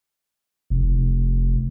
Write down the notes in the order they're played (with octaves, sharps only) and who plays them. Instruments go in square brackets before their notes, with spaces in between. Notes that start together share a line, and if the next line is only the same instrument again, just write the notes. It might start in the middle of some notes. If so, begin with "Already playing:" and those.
[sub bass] F1